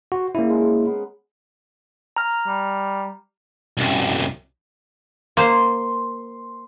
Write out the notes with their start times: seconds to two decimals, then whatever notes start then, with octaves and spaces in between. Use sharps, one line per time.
0.12 F#4 C5
0.35 A#2 C#3 A#3 E4
0.50 G#3 A#4 C5
0.87 B3
2.16 A#5 F6
2.47 G3
3.78 C2 F#2
5.37 A#3 C5 C6